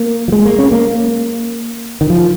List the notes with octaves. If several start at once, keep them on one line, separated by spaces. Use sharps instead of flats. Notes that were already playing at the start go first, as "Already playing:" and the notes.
Already playing: A#3
F3
G#3
A#3
C#4
A#3
D#3
F3